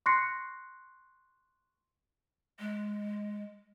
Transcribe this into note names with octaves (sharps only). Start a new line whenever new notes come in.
C6 C#6 F#6 A#6 C7 C#7
G#3